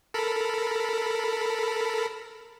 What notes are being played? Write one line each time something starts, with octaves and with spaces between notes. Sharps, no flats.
A4 A#4 B5